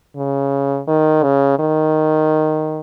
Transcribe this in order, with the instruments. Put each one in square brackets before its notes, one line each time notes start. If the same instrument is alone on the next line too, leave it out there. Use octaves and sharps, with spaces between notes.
[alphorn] C#3
D#3
C#3
D#3